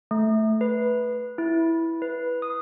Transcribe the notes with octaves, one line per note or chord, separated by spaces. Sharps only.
A3
B4
E4
B4
D#6